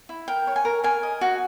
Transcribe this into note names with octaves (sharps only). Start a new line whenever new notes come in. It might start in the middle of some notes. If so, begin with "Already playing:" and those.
E4
A#4 G5
C#5
G#5
A#4
A#4 G#5
D#5
F#4